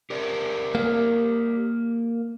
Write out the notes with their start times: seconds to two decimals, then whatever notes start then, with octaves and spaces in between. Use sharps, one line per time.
0.10 G4 A#4 D5
0.75 A#3